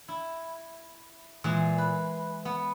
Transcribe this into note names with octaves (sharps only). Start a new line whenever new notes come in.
E4
A#2 E3 G#3
B4
B3